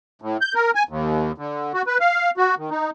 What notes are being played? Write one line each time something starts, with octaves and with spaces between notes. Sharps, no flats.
A2
G6
A#4
G#5
D#2
D3
F#4
B4
F5
F#4
D#3
D#4